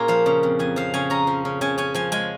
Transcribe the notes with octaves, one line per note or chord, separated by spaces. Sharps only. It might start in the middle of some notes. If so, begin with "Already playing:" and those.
Already playing: A#2 A#3 C#4 F4 G#4 A#4
F3 F5
C#3
F2
F2 G#5
F3 F5
C#3 G#5
C#4 A#5
F3
C#3
C#3 G#5
C#4 G#5
F3 G#5
G#3 G#5